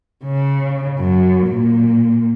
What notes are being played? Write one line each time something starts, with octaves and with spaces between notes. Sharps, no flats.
C#3
F#2
A#2